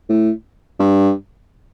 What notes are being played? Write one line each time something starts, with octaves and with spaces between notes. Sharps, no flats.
A2
G2